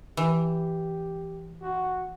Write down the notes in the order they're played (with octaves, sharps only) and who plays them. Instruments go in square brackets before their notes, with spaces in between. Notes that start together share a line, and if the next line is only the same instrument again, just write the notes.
[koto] E3 [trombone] G4
[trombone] F#4